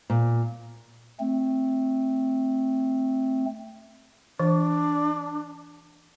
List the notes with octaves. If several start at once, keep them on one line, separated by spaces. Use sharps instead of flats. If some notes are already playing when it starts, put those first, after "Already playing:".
A#2
A3 C4
E3 D4